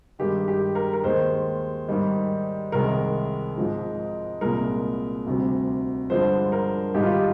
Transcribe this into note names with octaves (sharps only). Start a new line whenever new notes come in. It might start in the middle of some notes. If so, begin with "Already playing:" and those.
G2 D#3 G#3 G4
G4
A#4
A#4
D#2 D#3 G#3 C5
G#2 D#3 G3
C2 C3 D#3 G#3 A#4
G#2 F3 G#3
C2 A#2 G#3 A#4
D2 C3 G3
G2 D3 F3 G#3 C5
A#4
G#2 D#3 G3 G4
F4
G4